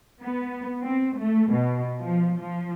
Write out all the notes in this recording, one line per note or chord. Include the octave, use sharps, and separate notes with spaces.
B3
C4
A3
B2
F3
F3